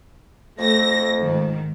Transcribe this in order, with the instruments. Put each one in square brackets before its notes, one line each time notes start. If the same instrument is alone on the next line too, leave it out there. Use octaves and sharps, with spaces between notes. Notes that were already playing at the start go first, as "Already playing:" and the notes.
[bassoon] F2 [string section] A3 A#6
[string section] G#2 D#3